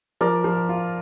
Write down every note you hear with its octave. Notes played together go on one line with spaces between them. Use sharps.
F3 A#4 D5
F3
F4